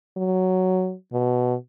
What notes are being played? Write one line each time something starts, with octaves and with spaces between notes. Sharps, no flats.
F#3
B2